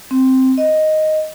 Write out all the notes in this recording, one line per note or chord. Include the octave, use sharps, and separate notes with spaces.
C4
D#5